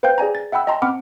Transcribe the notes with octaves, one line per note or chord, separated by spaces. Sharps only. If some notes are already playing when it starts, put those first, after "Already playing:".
B4 C5 F5 G5 G6
G#4 D5 G#5 A#5
A6
E5 F#5 G5 B5 E6
D#5 G5 A5 A#5 C6
C4 F#5 B5 D6 F6